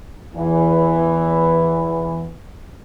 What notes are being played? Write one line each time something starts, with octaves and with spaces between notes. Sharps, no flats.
E2 E3